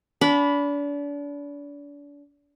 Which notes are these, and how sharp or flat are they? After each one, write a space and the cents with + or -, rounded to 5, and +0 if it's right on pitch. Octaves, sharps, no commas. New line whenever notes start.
D4 -35 B5 +0